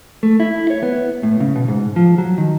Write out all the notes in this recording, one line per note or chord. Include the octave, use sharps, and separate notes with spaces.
A3
E4
C#5
B3
A2
C#3
B2
G#2
F3
F#3
D#3